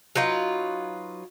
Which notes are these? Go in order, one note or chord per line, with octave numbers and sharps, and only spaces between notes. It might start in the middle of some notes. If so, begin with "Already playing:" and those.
F#3 D#4 F4 B4